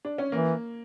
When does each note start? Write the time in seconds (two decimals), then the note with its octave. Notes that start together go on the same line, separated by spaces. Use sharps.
0.05 D4
0.18 C#4
0.32 E3 A#3